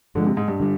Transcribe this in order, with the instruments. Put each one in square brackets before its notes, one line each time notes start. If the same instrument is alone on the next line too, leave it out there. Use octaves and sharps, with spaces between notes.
[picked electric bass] G2 F3 G#3 [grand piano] D3
[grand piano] C3
G#2
G2
[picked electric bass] D3 G3